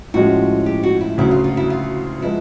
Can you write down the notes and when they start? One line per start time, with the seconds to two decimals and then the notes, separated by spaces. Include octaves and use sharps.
0.14 A2 F3 G#3 C#4 F#4
0.66 G4
0.83 F#4
1.01 E4
1.18 D2 C#3 F#3 E4
1.31 F4
1.44 F4
1.57 E4
1.70 F4
2.22 F3 G#3 B3 E4